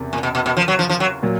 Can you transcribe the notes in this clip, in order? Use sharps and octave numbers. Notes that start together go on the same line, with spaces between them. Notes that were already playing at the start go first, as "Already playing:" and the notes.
Already playing: F#1 E2 C3
A#2
B2
B2
B2
F3
F#3
F3
F3
F#3
A#2 F#3